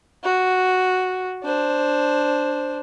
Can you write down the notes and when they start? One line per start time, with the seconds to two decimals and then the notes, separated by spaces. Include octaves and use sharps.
0.24 F#4
1.44 D4 C5